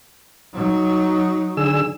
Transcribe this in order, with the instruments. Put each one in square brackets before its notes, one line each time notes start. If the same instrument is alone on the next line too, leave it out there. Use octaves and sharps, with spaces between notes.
[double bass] F#3 D#4
[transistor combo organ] D3 G#4 E6